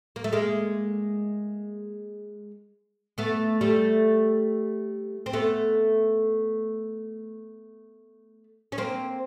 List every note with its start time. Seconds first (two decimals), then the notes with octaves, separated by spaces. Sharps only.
0.16 A#3
0.24 A3
0.33 G#3 A#3
3.18 A3 B3
3.61 G3 A3
5.26 C4
5.33 A3 B3
8.72 C#4
8.78 A#3 C4